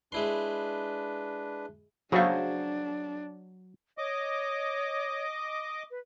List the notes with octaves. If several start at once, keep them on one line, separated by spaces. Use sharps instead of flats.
G#3 D4 E4 B4 C6
C#3 F#3 A3 D4 G#4 C5 F5
C#5 D#5 D6
B4